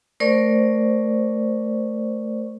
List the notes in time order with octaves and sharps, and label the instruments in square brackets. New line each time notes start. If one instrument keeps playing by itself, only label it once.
[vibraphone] A3 A#4 C5 D5 C#6